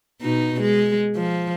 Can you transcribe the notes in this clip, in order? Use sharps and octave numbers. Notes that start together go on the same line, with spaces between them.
B2 D#4
G#3
F3